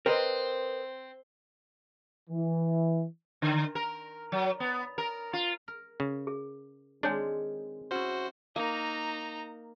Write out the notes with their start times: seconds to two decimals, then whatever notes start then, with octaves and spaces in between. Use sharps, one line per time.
0.06 C4 A#4 B4 D#5
2.30 E3
3.42 D3
3.75 A#4
4.32 F#3
4.60 B3
4.98 A#4
5.33 F4
5.68 A#4
6.00 C#3
6.27 G#4
7.03 D#3 G#3 C4 D4 G#4 C#5 G#5
7.91 C#4 E4 F#4 C5
8.56 A#3 D#4 A#5